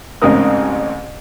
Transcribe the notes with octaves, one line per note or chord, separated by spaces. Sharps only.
A1 G#2 C#3 C4 A#4 D#6